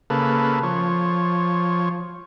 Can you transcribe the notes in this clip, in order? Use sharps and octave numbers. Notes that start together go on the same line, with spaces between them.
C#3 A#3 A4 B4
F3 C#5